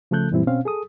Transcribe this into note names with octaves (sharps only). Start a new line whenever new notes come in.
C#3 F3 A3 A4 F#6 G6
F#2 A#2 E3 G3 C4 E4
B2 C4 C#4 F5
G#4 A4 D#6